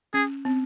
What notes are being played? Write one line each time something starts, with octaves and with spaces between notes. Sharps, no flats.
C#4 G#4
C4